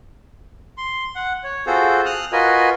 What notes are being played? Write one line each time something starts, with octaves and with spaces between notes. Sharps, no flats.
C6
F#5
C#5
C4 F4 F#4 G#4 A4 C5
D#6 F6 F#6
F4 F#4 A#4 B4 D#5 G#5